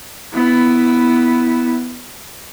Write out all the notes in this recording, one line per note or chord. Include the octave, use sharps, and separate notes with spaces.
B3 E4